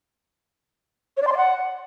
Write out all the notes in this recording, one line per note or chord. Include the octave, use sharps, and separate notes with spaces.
C#5
D5
C6
D5
F#5